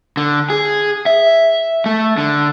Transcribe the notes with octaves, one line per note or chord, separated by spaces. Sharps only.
D3
G#4
E5
A3
D3